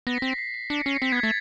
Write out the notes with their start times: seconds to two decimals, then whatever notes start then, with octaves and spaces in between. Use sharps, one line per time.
0.07 B3 A#6
0.18 C4 B6
0.28 C7
0.38 C7
0.54 C7
0.70 D4 C#7
0.82 C#7
0.86 C#4 C7
1.02 C4 B6
1.12 B3 G#6
1.23 A3 A6